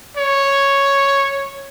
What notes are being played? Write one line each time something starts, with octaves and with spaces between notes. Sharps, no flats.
C#5